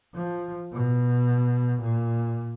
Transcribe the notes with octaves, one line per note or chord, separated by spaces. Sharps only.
F3
B2
A#2